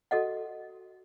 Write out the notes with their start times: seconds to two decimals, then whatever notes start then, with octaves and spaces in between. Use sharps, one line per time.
0.11 F#4 A4 D#5 F#5